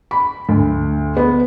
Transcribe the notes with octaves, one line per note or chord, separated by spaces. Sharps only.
B5
D2
B3